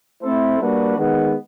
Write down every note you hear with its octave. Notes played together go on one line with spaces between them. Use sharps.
A3 C4 E4 A4 C5
G3 A#3 D4 F#4 B4
D#3 G#3 B3